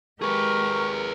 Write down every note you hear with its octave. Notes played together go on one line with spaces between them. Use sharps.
G#3 G4 G#4 A#4 B4 C#6